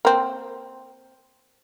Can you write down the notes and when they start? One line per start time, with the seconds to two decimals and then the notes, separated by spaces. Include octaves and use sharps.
0.05 A#3 C4